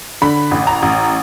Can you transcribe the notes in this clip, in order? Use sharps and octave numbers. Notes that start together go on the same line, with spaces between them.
D3 B5
A1
A#5
A1